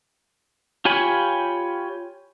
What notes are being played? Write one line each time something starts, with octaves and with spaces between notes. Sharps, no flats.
F4 G4 C#5 G#5 B5